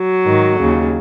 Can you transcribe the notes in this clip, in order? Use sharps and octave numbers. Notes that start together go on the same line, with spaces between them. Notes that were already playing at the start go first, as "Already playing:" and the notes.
Already playing: F#3
G#2 D#3
D#2 C#3